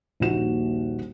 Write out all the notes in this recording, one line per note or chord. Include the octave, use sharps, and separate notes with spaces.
D#1 A#1 D#4 F#4 E7